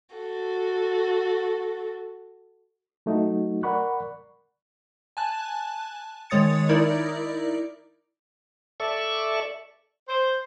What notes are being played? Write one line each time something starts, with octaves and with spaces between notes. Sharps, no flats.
F#4 A4
F#3 A3 D#4 F#4
A#4 D5 F#5 B5 C#6 F#6
G#5 A5 F#6
D#3 G#3 C#5 D#6 A6 C#7
D#4 E4 A#4 D5
A4 D5 E5 C#6
C5